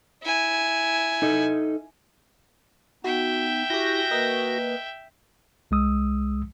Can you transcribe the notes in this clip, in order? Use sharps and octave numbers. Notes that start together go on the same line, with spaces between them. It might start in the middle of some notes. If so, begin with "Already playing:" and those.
E4 G#5
D#4 A4 D#5
B3 D#4 F#4 E5 G5
E4 F#4 G4 G#5 G6 A#6
A#3 A#4 B4 D#5
C2 G#3 D#6 E6